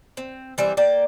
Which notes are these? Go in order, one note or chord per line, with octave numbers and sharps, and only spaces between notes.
C4
E3 G3 C4 E5
A#3 D5 G5